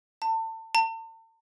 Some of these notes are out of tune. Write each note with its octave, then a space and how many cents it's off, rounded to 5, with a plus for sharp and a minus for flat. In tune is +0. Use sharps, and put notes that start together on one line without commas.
A5 +30
A5 +45